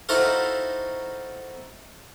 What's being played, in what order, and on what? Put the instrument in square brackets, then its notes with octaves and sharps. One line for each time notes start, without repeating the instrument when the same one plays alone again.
[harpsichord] D#4 E4 F#4 A4 C5 F5